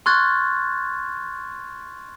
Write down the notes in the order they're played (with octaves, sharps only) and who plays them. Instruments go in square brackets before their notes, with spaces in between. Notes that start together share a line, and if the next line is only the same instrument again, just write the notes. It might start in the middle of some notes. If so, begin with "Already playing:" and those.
[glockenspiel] C6 C#6 F6 F#6 G#6 A6